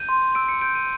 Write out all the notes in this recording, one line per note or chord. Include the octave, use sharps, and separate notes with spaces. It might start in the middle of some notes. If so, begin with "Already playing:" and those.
Already playing: G6 D#7
C6
E6 D7
C#7
G6 D7
D#7